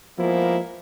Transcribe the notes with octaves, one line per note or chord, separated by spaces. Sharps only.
F3 G#3 A#3 B3 E4